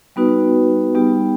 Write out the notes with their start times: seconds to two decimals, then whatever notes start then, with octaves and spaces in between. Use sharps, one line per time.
0.16 G3 B3 D#4 F#4 B4
0.95 G3 B3 D#4 G4